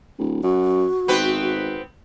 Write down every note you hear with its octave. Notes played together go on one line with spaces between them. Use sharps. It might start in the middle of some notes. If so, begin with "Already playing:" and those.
D1
F#2 F#4
G#1 B3 C4 B4